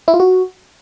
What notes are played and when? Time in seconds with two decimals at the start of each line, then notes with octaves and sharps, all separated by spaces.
0.08 E4
0.14 F4
0.20 F#4